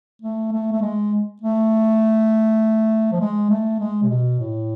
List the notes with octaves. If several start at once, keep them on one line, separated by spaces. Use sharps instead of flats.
A3
A3
A3
G#3
A3
F3
G#3
A3
G#3
C3
B2
A2